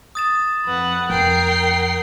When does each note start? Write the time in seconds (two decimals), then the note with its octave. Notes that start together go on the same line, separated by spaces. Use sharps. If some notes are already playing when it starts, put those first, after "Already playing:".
0.15 D#6 A6 E7
0.65 F2 B4 F#5
1.10 F2 A#4 G5 C7